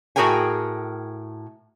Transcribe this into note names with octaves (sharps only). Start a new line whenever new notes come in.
A2 F#4 G#4 A#4 G5 G#5